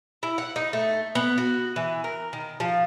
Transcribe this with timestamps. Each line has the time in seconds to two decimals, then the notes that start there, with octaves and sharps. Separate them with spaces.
0.23 E4
0.38 F#5
0.56 D#4
0.73 A3
1.15 B3
1.38 F#4
1.76 E3
2.04 A#4
2.33 D#3
2.60 F3